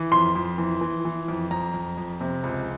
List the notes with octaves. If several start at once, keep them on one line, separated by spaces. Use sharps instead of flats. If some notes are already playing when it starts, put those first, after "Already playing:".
Already playing: E3
F2 C6
F2
E3
E3
E3
F2
F2 A#5
F2
F2
C3
C#2